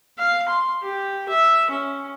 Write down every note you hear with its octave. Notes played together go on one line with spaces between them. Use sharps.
F5
C6
G4
E5
C#4